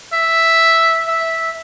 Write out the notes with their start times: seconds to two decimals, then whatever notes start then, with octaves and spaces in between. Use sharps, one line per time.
0.14 E5
1.08 E5